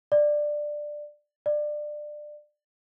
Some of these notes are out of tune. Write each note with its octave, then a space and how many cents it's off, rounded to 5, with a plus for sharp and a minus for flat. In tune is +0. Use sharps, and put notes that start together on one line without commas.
D5 +10
D5 +20